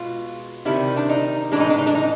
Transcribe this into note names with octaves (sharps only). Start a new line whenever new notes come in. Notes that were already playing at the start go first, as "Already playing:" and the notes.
Already playing: B2 G#3 F4
C3 D#3 G3 E4
D4
D#4
A2 E3 G#3 D4
D#4
D4
D#4
D4
D#4